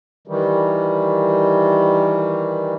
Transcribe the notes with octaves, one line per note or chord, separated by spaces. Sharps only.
D#3 E3 G3